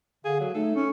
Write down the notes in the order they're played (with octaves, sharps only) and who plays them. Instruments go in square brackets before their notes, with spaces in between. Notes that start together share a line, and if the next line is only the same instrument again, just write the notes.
[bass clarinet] D3 [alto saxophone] G#4 [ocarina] F5
[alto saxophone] F#3
[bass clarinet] A3 [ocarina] D#4 [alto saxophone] A4
[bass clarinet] C#4